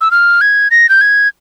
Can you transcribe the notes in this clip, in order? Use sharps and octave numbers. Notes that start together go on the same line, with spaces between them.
E6
F6
G#6
A#6
G6
G#6